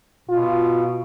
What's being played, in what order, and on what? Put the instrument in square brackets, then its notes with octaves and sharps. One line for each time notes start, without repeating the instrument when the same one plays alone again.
[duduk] B2 [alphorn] F4